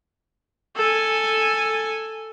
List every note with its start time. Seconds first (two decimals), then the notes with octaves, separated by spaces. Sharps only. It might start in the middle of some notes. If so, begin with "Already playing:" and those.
0.76 A4 G#5